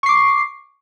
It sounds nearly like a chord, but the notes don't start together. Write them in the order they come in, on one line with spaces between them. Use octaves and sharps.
C#6 C7 D6